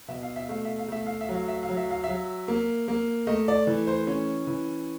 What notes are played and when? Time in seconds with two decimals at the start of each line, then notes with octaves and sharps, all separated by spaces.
0.08 B2 E5
0.23 F5
0.36 E5
0.49 A3 F5
0.65 E5
0.79 F5
0.88 A3 E5
1.06 F5
1.21 E5
1.29 F#3
1.35 F5
1.48 E5
1.63 F5
1.69 F#3
1.77 E5
1.90 F5
2.04 F#3 E5
2.48 A#3
2.88 A#3
3.27 A3 D#5
3.48 D5
3.67 E3
3.87 C5
4.07 C#4 C#5
4.47 E3